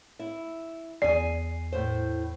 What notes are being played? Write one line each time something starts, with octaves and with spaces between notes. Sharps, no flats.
E4
E2 G#4 D5 G#5 C7
A2 C5